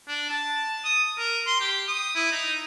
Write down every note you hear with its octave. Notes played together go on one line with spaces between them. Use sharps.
D4
A5
D#6
A#4
C6
G4
D#6
E4
D#4